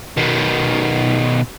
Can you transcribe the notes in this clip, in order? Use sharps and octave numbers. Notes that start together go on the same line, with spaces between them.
B2 D#3